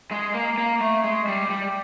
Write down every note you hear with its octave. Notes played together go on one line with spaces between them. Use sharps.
G#3
A#3
A#3
A3
G#3
G3
G3